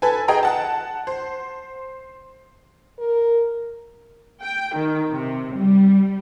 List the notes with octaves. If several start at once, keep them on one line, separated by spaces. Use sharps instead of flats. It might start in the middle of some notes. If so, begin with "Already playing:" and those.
A4 B4 G#5
G#4 D#5 G5 A#5
F#5 A5
C5
A#4
G5
D#3
C3
G3